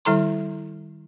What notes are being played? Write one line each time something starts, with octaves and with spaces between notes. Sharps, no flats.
D#3 G3 E4 A4 A#5 C6